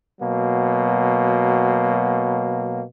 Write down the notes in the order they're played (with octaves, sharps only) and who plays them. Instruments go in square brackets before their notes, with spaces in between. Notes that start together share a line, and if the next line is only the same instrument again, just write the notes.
[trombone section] B2 F#3 A#3